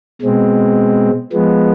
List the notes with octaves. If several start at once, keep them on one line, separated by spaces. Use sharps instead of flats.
B2 G#3 C4
F3 G#3 B3